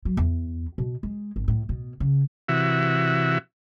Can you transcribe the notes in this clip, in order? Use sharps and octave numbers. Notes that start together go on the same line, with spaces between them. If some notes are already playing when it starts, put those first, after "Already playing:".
F#3
E2
B2
G#3
G#1
A2
B2
C#3
C3 E3 F#4 E5